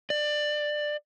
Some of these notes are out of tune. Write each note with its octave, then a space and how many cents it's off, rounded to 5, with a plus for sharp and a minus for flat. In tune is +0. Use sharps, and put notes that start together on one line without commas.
D5 +20